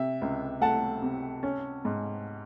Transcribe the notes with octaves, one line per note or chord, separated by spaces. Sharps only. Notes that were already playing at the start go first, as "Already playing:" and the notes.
Already playing: C3 E5
C#2
A3 F#5 A5
C3
C#4
G#2